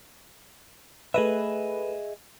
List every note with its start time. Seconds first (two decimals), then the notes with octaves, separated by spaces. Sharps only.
1.14 A3 G#4 B4 D#5 E5